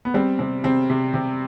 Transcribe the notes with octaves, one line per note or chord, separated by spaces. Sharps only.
B3
G3 C4
C3 C4
C3 C4
C3
C3